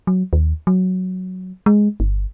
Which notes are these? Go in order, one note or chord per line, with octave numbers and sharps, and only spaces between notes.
F#3
D#2
F#3
G#3
G1